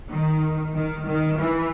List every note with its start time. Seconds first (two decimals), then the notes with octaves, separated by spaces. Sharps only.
0.12 D#3
0.77 D#3
1.08 D#3
1.39 E3